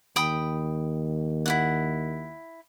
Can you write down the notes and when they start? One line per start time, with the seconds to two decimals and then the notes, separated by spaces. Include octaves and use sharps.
0.16 D#2 G5 B5 D#6
1.46 E4 F4 F#5